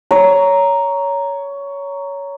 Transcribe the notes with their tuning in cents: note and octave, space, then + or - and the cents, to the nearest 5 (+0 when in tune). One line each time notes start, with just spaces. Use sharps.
C#5 +15 A#5 +0